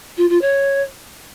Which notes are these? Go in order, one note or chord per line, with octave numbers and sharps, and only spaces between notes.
F4
F4
C#5